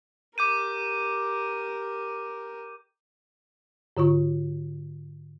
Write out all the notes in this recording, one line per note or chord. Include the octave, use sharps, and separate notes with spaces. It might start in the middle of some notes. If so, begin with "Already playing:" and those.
G4 A#4 D6 G6 D#7
G#2 D3 F4 C#6